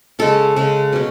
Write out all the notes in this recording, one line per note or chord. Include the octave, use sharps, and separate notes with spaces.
C#3 G#3 C#4 A4
C#3 G#3 C#4
B2 F#3 C#4